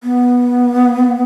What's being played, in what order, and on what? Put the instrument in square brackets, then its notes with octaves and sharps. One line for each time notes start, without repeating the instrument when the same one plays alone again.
[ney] B3